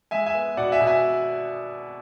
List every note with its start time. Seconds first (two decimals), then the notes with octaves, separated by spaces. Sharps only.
0.11 G#3 E5 G#5
0.26 E5 G#5
0.34 B3
0.57 B2 D5 F#5
0.72 E5 G#5
0.80 B2
0.87 E5 G#5